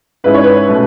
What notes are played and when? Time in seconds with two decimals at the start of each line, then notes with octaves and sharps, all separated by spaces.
0.24 G#2 G#3 C#4 E4 B4
0.34 C#5
0.43 B4
0.68 B2 A3 C#4